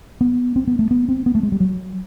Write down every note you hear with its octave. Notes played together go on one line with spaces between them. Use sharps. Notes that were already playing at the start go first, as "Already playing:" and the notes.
B3
C4
B3
A3
B3
C4
B3
A3
G#3
G3
F#3